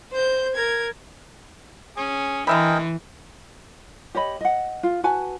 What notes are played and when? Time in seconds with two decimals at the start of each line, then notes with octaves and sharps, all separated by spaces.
0.11 C5 G6
0.55 A#4 G#6
1.97 C#4 G#4
2.47 D3 E3 A#4 D#5 E5 G5 G#5 B5
4.15 G4 C#5 D#5 B5
4.41 D#5 F#5
4.83 F4
5.04 F#4 B4 G#5 A5